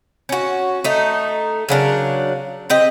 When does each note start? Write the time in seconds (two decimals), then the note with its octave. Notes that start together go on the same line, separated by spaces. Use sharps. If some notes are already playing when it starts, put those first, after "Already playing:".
0.29 C#4 F#4
0.84 A3 D#4
1.69 C#3 F#3 D4 A#4
2.70 C4 G4 D#5